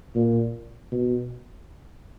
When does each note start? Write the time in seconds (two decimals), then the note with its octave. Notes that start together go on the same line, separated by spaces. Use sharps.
0.15 A#2
0.92 B2